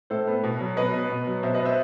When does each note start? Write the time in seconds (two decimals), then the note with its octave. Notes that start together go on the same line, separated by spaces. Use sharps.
0.10 A2 A4 C5
0.27 B3
0.44 B2
0.60 F#3
0.77 B2 B4 D#5
0.94 B3
1.10 B2
1.27 F#3
1.43 B2 C5 E5
1.54 B4 D#5
1.60 B3
1.65 C5 E5